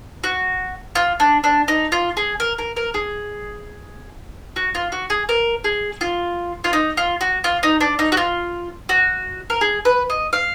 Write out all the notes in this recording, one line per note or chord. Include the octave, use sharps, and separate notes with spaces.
F#4
F4
D4
D4
D#4
F4
G#4
A#4
A#4
A#4
G#4
F#4
F4
F#4
G#4
A#4
G#4
F4
F4
D#4
F4
F#4
F4
D#4
D4
D#4
F#4
F4
F#4
A#4
G#4
B4
D#5
F5